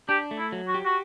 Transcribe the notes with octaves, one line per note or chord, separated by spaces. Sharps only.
D4 G4
A3
E4
F#3
F#4
G4
F#4